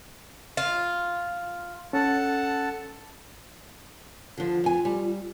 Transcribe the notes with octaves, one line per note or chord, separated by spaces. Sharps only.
F4
C#4 A4 F#5 A5
D3 F3 F4
F2 G#5
G3